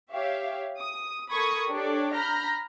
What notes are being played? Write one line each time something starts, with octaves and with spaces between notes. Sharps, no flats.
G4 C#5 E5 F5
D#6
A4 A#4 B5 C#6 D#6 G#6
D4 G4 A4 C#5 D5
A#5 B5 F6 G6 A#6